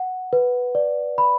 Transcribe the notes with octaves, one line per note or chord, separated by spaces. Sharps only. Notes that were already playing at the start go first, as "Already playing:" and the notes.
Already playing: F#5
B4
D5
B5